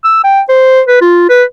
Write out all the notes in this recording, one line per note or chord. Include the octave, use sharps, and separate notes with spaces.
E6
G5
C5
B4
F4
B4